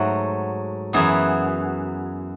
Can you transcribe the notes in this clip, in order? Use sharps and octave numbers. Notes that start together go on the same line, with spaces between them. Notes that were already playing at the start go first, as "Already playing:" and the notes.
Already playing: G#2 F#3 A3 F#4
F#2 E3 B3 G#4